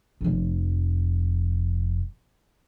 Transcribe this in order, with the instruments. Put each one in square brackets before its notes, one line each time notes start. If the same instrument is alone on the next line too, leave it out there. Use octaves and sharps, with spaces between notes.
[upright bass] F1 F2